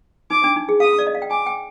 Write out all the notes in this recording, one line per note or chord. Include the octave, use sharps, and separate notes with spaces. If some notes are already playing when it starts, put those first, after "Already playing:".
D#4 D6
D4
D#4
G#4
F5 D#6
D5
D#5
F5
G5
G#5 D6
G5